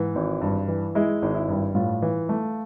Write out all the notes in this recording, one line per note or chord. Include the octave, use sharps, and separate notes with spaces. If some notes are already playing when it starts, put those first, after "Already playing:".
Already playing: G#2 E3
G#1
G2
E3
G#3 E4
G#1
E4
G2
A2 F4
E3
A3